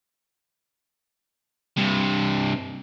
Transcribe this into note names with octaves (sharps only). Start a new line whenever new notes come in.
G2 C3